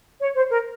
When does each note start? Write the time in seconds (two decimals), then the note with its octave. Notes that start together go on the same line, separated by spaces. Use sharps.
0.20 C#5
0.36 C5
0.50 A#4